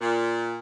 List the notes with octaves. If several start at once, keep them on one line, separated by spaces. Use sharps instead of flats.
A#2